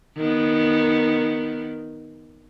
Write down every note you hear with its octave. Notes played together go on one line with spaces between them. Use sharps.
D#3 B3